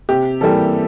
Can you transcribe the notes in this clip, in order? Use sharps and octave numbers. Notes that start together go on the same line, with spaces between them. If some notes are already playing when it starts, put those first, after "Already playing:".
C3 G4
E3 G3 A#3 A4